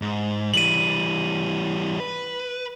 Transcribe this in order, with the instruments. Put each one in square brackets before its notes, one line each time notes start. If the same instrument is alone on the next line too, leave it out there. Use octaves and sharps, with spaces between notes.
[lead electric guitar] G#2
[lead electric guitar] E3 G3 [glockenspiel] D#7 F#7
[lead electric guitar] B4